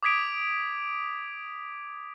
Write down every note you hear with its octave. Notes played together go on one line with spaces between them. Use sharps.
D6 D#6 G#6 B6 D7 F7